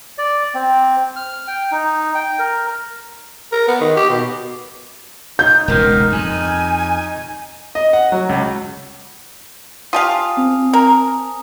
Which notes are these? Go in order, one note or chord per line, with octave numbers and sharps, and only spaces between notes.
D5
C4
F6
G5
D#4
G5
A#4
A#4
B3
D#3
G4
B2
D#4 G6
E1 C#2 A#2 A#4
F2 G#5
D#5
F#5
F#3
C#2
F4 G4 F5 G#5 A5 D#6
C4
A#4